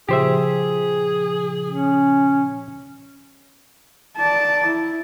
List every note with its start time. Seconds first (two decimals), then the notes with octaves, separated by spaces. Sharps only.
0.09 A#2 C#3 F3 G4 G#4 C5 E5
1.68 C#4
4.16 D5 A5
4.66 E4